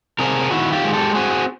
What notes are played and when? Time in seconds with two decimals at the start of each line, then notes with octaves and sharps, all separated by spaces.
0.19 C3 G#4 A#4
0.51 D#3 E4 F#4
0.72 F4 G4
0.84 G#3
0.93 G4 A4
1.15 C4 F#4 G#4